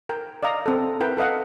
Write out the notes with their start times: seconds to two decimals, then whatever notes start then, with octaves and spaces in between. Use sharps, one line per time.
0.09 A#4 G5
0.43 D5 D#5 F5 A#5
0.66 C4 A4
1.00 E4 A#4 B4 G5
1.17 A4 B4 D#5 F5 F#5